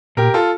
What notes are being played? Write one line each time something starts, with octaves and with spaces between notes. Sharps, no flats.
A#2 G4 A#4
F4 A4